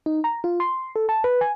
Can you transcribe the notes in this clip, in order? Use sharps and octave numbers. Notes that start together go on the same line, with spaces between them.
D#4
A#5
F4
C6
A4
A5
B4
G#5